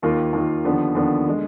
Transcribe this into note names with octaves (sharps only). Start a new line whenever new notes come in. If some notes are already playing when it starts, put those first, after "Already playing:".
D#2 D#3 A#3 F4
D#2 D#3 A#3 F4
D#2 D3 F3 B3 D4
D#2 D3 F3 B3 D4
D3 G#3